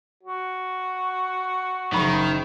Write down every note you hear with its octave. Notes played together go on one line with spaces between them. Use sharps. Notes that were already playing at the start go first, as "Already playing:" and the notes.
F#4
F#1 D#3 B5 C#6